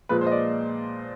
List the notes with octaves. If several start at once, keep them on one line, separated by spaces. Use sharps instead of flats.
A#2 F3 G#3 B4
C5
D#5
D5